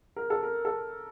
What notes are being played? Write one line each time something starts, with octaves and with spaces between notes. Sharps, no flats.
A#4
A4
A#4
A4